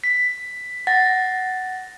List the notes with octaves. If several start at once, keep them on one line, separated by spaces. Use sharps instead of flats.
B6
F#5 A6 A#6